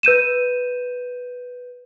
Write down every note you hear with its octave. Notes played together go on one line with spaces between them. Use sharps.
B4 G6 D#7 E7